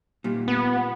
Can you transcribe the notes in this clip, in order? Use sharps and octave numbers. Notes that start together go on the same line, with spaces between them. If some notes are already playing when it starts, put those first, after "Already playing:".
A#2 G3
B3